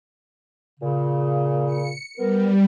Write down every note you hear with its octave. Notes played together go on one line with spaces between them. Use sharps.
A#2 C#3
C#7
G3 B3 A#4